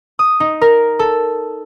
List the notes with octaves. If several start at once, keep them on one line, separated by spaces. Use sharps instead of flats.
D#6
D#4
A#4
A4